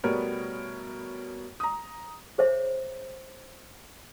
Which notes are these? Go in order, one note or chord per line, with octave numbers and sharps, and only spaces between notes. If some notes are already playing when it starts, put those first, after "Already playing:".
B2 G3 A3 B3 A#4 C#5
A#5 D#6
G#4 C5 C#5 E5